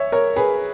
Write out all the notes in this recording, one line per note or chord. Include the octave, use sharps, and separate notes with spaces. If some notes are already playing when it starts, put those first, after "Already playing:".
Already playing: C#5 E5
A#4 C#5
G#4 B4